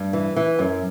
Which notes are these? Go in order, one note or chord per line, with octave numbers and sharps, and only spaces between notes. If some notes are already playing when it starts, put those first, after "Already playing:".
Already playing: G2
E3
E3
F#2